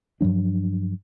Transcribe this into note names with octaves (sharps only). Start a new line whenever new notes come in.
G2 F3 F#3 D4